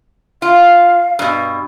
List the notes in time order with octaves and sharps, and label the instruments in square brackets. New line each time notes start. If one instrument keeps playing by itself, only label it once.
[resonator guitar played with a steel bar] F4 [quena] F5
[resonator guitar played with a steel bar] G2 B2